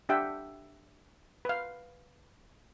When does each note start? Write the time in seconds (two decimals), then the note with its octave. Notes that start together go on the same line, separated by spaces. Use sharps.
0.09 D4 G4 E5 F#5 G5
1.45 B4 F5